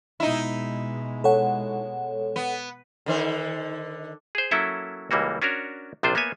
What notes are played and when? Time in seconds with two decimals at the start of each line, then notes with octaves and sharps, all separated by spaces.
0.20 B2 G#3 D#4 E4
1.24 A4 C#5 F#5
2.36 B3
3.06 D3 D#3 C5
4.35 G#4 C5
4.51 F#3 A#3 C#4 E4 A4 E5
5.11 C#2 E3 G3 A#3 F#4
5.42 C#4 D4 F#4 A#4 C#5
6.03 A#1 C3 D4 F4 C5
6.15 A#3 B3 C#5 E5 G#5